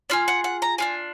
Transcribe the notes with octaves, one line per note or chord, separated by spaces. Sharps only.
D4 F4 G#4 F6
F#5
F#5
A#5
D4 F4 G#4 G#5